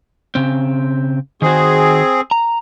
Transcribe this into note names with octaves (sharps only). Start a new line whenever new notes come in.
C#3 C4
D#3 C4 F#4 G#4
A#5